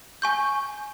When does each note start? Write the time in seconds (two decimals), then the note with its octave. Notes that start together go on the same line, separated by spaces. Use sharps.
0.22 G#5 C#6 G6